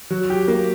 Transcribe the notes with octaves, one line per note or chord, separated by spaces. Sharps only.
F#3
G4
A#3